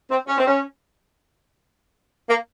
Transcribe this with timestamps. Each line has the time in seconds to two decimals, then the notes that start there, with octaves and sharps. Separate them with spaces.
0.11 C4
0.28 C#4
0.38 C4
0.47 C#4
2.29 A#3